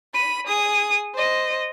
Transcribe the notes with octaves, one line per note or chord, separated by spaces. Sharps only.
B5 D#7
G#4 D#6
C5 D#5